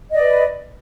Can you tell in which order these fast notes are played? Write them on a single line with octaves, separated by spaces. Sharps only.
D#5 D5 B4